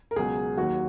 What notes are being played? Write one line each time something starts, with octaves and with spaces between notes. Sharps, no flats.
A#4
C#2 B2 F#3 G#4
D#2 D#3 F#3 F#4